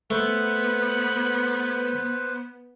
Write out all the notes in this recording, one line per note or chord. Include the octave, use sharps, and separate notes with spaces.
A3 B3 B4 C5